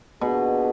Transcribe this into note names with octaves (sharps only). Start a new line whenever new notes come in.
B2 A#3 D4 F4 G#4